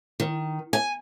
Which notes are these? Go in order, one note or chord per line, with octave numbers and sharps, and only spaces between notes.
D#3
G#5